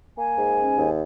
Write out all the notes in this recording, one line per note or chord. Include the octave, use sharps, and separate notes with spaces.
A#3 G#5
G#2
C#4
D#2